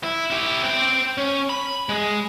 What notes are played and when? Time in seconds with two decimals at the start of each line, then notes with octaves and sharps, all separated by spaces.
0.03 E4
0.30 E4 G4
0.63 C4 G5
1.18 C#4
1.49 B5
1.89 G#3